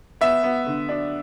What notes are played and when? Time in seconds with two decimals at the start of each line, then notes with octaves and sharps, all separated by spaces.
0.21 B3 E5
0.43 B3
0.67 D3
0.89 D4